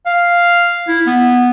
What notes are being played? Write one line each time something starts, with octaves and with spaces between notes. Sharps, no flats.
F5
E4
B3